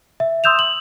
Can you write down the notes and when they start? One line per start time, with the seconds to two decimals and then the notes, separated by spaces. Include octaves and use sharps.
0.20 E5
0.44 C6 D#6 E6 G6 E7 F7
0.59 F#7